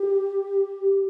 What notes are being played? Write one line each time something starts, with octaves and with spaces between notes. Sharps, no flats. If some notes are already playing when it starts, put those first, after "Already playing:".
Already playing: G4